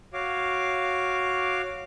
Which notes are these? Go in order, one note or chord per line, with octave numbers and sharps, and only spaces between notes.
F#4 C#5 F5 D6